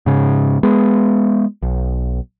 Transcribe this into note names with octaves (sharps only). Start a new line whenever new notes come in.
G#2 C#3
G#3 B3
B1